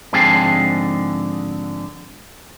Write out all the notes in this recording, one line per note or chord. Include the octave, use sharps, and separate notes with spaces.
G#2 D3 F3 C4 G#4 A5